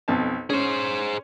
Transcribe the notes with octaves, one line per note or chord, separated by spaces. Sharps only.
B1 F2 A5
C#4 G#4 C5